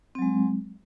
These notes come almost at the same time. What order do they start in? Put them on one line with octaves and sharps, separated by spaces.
C4 F#3 G#3